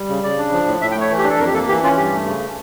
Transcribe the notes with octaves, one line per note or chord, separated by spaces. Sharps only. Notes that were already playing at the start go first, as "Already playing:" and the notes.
Already playing: G3
C#3
C#3 D5
D4
F3
A2
A2 E5
G5
A3 C#5
E3
G4
D4 A4
F2 A#4
G4
A#3 A4
E3 G4
C#4 F4
G2 G4
A3
C#3